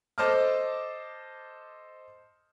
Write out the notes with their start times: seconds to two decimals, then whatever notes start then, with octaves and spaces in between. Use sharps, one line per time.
0.18 A4 C5 D#5 A5 D6 F6